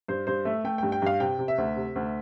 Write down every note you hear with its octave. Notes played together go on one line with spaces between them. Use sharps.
G2 C5
G2 C5
A3 E5
A3 G5
G2 G5
G5
G2 F5
C3 G5
C3
E5
D2
C3
D2